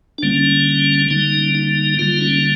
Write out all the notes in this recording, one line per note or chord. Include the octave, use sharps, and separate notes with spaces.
D4
D3 G3 A#3 C#4
D3 G3 A#3 D#4
D#4
D3 G3 A#3 F4
C#4